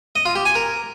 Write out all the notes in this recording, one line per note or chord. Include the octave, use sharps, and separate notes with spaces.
D#5
F4
G4
G#5
A#4